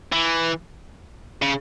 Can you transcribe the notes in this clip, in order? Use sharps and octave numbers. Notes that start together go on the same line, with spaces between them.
E3
C#3